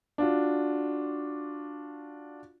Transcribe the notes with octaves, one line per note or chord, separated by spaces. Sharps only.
D4 F4 F#4